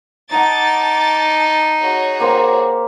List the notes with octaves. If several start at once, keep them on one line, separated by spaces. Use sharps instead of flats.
D#4 F#5 A5 A#5 D6 A6
F#4 G#4 C#5
A#3 G4 C5